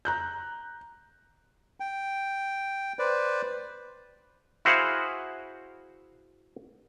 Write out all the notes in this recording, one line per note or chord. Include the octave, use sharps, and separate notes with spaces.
A#5 F#6 G6
G5
B4 C5 D5
E4 F#4 G#4 C5 F5 F#5